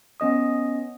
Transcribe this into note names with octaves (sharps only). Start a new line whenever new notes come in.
B3 C#4 D#5 D#6